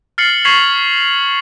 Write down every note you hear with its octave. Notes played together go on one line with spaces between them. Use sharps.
F6 A6 C7 C#7 F#7
C#6 G#6 B6 C7 F7 F#7